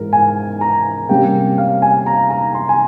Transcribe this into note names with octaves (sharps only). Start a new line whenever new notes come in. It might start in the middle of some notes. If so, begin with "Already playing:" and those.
Already playing: G#2 E3 G#3 A#4
G#5
A#5
C3 G3 A#3 C#4 G5
F5
G#5
A#5
A#5
C6
G#5